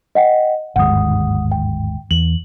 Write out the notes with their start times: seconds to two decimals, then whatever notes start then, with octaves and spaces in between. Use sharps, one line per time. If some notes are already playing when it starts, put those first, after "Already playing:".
0.15 D#5 F#5 G5
0.76 G1 D#2 G#2 F#5 D#6
1.52 G5
2.11 E2 F#7